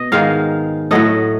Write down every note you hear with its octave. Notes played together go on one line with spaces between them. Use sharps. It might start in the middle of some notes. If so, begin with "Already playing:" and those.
Already playing: B2 D#5
G#2 D#3 G#3 F5
A2 F#3 A3 D#5